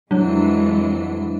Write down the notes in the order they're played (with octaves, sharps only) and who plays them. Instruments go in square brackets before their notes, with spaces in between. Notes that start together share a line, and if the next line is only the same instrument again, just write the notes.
[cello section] F2 E3 G#3 [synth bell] F#3 D4